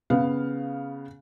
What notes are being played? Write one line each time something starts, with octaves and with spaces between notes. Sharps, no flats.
C#3 B3 F5